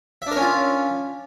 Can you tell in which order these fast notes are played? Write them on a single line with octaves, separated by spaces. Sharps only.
E5 D4 A#4 C#4 F4